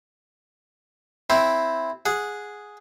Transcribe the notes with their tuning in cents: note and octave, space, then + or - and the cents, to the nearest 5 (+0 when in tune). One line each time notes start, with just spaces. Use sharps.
C4 +0 E4 +0
G#4 +0 F#5 -15